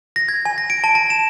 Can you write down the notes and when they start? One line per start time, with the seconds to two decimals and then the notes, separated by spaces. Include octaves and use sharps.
0.16 A#6
0.29 G#6
0.45 G#5
0.58 A#6
0.70 D7
0.84 A5
0.95 A5
1.10 E7